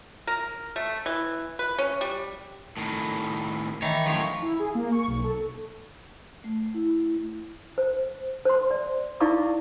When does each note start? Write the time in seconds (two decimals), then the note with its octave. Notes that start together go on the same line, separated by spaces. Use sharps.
0.27 A#4
0.76 A3
1.06 E3
1.59 B4
1.78 C#4
2.01 G3
2.77 A2 D#3
3.82 D#3 E3 C#5
4.06 F#2 A2 F3 C#5
4.42 E4
4.59 G#4
4.75 A#3
4.92 C#6
5.07 B1
5.24 A4
6.44 A3
6.74 E4
7.78 C5
8.45 C5 C6
8.71 D5
9.20 D#4 E4 D5 F5 C#6 D6